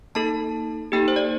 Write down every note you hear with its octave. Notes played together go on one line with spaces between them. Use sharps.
A#3 D#4 A4 A5
A#3 D#4 G4 A4 G5
C5
D5